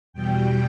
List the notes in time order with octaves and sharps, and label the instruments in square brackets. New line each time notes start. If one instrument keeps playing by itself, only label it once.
[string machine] E2 B2 G3 G5